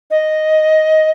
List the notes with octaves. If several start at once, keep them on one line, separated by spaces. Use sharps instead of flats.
D#5